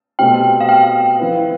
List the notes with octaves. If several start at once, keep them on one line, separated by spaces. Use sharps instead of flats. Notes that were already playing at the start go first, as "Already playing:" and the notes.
B2 A3 C4 G4 G5
F5
G5
F3 C4 E4 B4